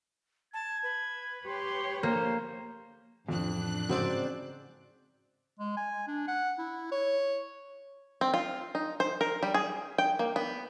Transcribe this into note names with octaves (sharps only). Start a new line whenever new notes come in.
A5 G#6
B4
G4 C#5 C6
A#3 C5
A1 F2 D4 F#6
G#2 C#3 C4 F#4 C5 D5
G#3
G#5
D4
F#5
E4
C#5
C4
F4
D#4
C5
A#4
G3
G#4
G5
A#3
B3